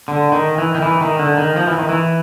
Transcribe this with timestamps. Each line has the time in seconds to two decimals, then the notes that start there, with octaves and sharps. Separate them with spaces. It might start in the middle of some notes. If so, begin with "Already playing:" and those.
0.08 D3
0.32 D#3
0.58 E3
0.75 D#3
0.82 E3
1.01 D#3
1.19 D3
1.37 D#3
1.56 F3
1.67 E3
1.78 D#3
1.89 E3